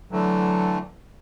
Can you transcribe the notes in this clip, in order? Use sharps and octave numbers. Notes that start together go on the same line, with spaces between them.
D3 E3 F#3 A3